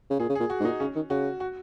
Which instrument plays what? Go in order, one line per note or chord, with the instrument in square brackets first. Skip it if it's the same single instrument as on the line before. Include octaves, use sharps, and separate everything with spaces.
[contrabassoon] C#3
[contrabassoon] A#2 [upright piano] G#4
[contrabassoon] C#3
[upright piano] G#4
[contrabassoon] A#2
[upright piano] F#4
[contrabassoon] G#2
[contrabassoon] A#2 [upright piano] D#4
[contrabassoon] C#3 [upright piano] C#4
[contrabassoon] D#3
[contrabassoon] C#3 [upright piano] F#4
[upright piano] F#4